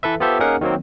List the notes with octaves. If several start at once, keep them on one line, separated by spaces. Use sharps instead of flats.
E3 A4 B4 E5
B3 F4 G4 A4 C5 E5
A#3 C#4 D#4 G#4 A#4 F#5
D#3 F#3 A#3 C4